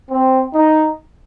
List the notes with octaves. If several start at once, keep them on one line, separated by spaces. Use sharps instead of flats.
C4
D#4